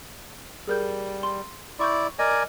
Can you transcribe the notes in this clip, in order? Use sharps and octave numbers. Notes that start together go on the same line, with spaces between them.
G3 G#4 A#4 G6
C6
E4 D5 C6 C#6 G6
A#4 D5 D#5 G#5